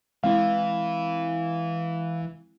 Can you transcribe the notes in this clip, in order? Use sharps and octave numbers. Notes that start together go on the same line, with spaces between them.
E3 G#3 C4 E4 F5